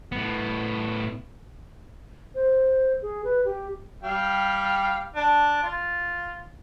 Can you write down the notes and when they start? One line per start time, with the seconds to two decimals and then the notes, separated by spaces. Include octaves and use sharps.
0.12 A2 B3
2.35 C5
3.02 G#4
3.24 B4
3.45 G4
4.03 G3 F5 G5
5.15 D4
5.63 F4